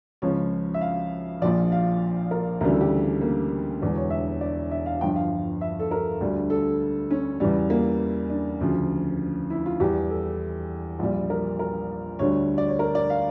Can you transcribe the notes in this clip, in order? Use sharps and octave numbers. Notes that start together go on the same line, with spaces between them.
C#2 C#3 F3 C#5
E5
F5
A#1 A#2 F3 D5
F5
A#4
D2 C#3 E3 G3 A#4
A4
G4
A#3
E1 E2 D3 D4
C#5
E5
D5
E5
F5
G1 G2 F3 G5
F5
E5
A4
A#4
D2 D3 G3
A4
C#4
E2 C#3 E3 G3
A#3
D4
D2 C#3 F3
E4
F4
E2 E3 G3 G4
A4
A#1 A#2 G3
A#4
A#4
D2 D3 G3 C#5
D5
C#5
A#4
D5
F5